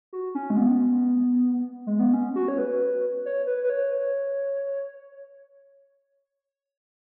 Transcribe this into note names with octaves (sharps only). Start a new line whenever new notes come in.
F#4
C#4
G#3
B3
G#3
B3
C#4
F#4
C#5
B4
C#5
B4
B4
C#5